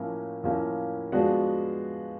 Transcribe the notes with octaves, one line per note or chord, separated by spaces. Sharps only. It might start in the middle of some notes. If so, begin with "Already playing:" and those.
Already playing: A2 F3 A#3 C#4 E4
A2 F3 A#3 C#4 E4
F3 G#3 B3 D4 F#4